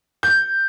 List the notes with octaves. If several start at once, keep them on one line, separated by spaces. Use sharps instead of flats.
G6